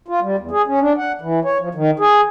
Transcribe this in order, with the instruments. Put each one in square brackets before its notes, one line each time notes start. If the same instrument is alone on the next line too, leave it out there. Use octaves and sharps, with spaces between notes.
[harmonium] F4
G3
E2
G#4
C#4
D4
F#5
E3
C#5
F3
D#3
G#4